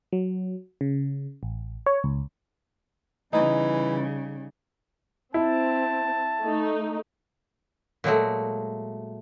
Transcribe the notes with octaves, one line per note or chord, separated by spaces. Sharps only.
F#3
C#3
A1
C#5
C#2
C#3 E3 G3 D#4
C4 E4 A5
A3 D#4
A#2 F#3 G#3 A3